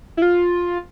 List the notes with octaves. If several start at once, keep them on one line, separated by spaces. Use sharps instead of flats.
E4
F4